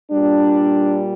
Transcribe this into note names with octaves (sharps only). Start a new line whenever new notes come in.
A#2 G3 D4